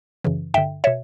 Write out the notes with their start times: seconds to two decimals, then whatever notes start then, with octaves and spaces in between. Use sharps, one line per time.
0.24 F#2 C#3 E3
0.54 G2 D3 E5 G5
0.84 B2 C#5 E5